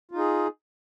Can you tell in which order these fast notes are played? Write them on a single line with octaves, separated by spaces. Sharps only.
F4 D#4 G#4